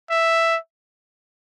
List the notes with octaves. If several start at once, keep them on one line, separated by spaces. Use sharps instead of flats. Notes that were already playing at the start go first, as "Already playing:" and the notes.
E5